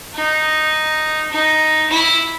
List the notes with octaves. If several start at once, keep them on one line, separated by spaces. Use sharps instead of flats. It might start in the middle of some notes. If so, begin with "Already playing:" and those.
D#4
D#4
E4